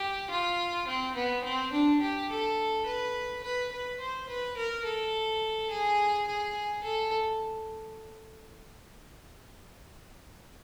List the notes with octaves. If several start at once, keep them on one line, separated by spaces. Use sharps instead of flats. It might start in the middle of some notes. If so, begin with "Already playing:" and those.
Already playing: G4
F4
C4
B3
C4
D4
G4
A4
B4
B4
B4
C5
B4
A#4
A4
G#4
G#4
A4